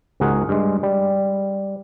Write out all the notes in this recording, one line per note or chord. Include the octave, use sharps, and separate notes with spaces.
C#2 G#2 F#4 G#4 A#4 F#5
G2 G#3
G3